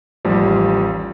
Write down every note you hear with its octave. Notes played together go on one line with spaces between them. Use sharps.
A1 D#2 F3 G3